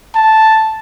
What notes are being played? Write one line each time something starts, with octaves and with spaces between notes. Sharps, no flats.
A5